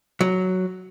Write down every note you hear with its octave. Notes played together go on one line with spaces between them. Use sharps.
F#3